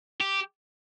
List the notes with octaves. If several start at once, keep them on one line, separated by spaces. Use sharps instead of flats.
G4